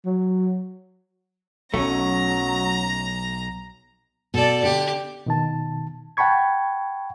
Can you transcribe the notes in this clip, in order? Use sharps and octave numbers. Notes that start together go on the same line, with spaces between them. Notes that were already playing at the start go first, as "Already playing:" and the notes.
F#3
B1 F#3 A3 C#4 A#5
B2 A4 D5
D3 G4
B2 D#3 A5
F#5 G5 A5 B5 C#6 G#6